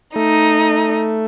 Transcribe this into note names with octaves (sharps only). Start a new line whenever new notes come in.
A3 D#4